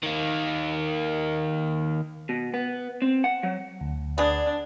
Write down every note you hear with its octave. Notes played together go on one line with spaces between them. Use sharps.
D#3 A#3
B2
B3
C4
F#5
F#3
D2
B3 D4 G#4 D5